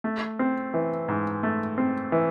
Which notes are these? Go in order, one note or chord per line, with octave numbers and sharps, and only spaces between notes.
A3
C4
E3
G#2
A3
C4
E3